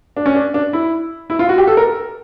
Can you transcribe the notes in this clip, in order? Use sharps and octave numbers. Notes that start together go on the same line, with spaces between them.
D4
C#4
D4
D4
E4
E4
F4
F#4
G4
A4
A#4